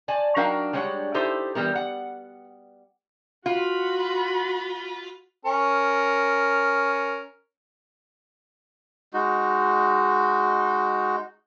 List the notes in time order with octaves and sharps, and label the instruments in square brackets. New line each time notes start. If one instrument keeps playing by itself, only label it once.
[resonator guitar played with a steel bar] D5 G#5 A5
F#3 D4 D#4 A#4 F5 G5
G3 G#3 D4 C#5 F#5
D#4 E4 G4 A4 C5
E3 G3 B3 A#4
F#5
[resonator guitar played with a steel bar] F4 [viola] F#4 B5
[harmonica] C#4 A#4
[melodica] G#3 D#4 F#4